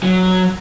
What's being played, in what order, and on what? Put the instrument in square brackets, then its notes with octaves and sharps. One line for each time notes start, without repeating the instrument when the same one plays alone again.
[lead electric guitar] F#3